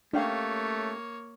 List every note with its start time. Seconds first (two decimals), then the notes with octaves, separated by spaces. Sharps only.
0.13 A3 A#3 C#4 D4 G4 C#5 F5